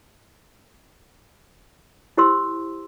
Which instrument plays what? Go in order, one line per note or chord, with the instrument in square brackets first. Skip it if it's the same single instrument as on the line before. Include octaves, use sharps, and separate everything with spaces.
[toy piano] E4 G4 C5 C6 E6